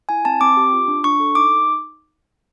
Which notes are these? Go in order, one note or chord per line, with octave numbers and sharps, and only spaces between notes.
E4 G#5
C4 A5
C4 D6
G4
F4
D4
D4 C#6
A4
D#4 D6